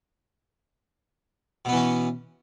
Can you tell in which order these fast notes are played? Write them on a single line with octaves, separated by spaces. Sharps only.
B2 B3 E3 C#4